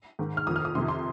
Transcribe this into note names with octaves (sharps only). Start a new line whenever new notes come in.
G#2 D#3
F6
F2 D#3 D#6
F6
D#6
F2 C3 D#3 C6
C6